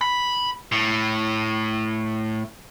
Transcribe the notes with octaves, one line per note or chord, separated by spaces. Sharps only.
B5
A2